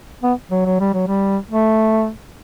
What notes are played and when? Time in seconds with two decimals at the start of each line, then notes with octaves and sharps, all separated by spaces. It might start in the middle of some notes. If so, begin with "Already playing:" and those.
0.23 B3
0.51 F#3
0.66 F#3
0.80 G3
0.94 F#3
1.08 G3
1.51 A3